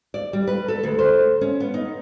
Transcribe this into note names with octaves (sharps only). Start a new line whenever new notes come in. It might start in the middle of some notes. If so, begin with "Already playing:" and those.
D5
G3
B4
A4
D2
C5
C#4
B3
D#4